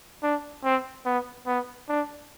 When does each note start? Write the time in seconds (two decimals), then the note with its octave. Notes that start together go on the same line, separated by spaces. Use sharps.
0.23 D4
0.64 C4
1.05 B3
1.47 B3
1.88 D4